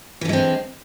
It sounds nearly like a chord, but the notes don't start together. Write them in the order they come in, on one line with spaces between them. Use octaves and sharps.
E3 D3 G#3 C4